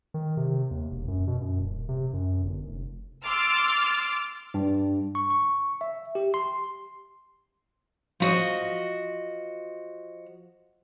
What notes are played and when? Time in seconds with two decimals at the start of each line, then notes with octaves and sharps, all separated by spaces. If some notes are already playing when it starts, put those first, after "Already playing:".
0.14 D#3
0.37 C3
0.71 D#2
0.91 E1
1.08 F#2
1.27 B2
1.41 F#2
1.60 D#1
1.89 C3
2.13 F#2
2.43 G1
2.66 F1
3.25 C6 D6 E6 F6 A6
4.54 G2
5.15 C#6
5.30 C#6
5.81 E5
6.15 G4
6.34 C6
8.20 F3 F#4 D#5